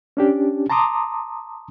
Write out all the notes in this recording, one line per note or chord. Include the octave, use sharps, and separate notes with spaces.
C#4 D4 G4
A5 A#5 C6 D6 D#6